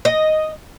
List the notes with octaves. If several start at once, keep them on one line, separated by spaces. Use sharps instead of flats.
D#5